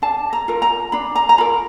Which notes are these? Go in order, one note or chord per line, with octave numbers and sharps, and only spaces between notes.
D4 A5
A#5
F4 A#4
A#5
D4 B5
A#5
A#5
F4 A#4 B5